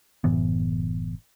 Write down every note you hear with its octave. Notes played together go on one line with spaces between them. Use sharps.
F#1 A2 E3 B3